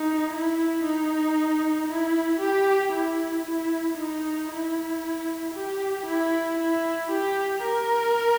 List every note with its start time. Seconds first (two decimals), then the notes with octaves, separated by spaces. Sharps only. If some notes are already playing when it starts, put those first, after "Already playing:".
Already playing: D#4
0.31 E4
0.83 D#4
1.88 E4
2.40 G4
2.93 E4
3.45 E4
3.98 D#4
4.50 E4
5.54 G4
6.06 E4
6.59 E4
7.11 G4
7.63 A#4